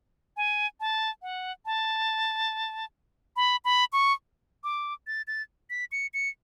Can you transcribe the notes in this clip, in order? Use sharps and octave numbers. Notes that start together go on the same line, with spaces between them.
G#5
A5
F#5
A5
B5
B5
C#6
D6
A6
A6
B6
C#7
C#7